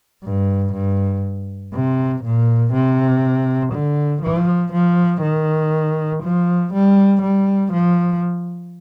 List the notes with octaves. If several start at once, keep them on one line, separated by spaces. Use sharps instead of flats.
G2
G2
C3
A#2
C3
D3
F3
F3
D#3
F3
G3
G3
F3